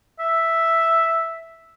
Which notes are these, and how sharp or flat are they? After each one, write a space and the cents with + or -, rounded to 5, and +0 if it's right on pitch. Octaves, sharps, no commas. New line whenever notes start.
E5 +0